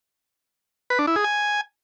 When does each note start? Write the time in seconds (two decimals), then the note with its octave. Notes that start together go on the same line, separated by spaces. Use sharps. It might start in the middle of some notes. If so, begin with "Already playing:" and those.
0.90 B4
0.99 D4
1.07 E4
1.16 G#4
1.24 G#5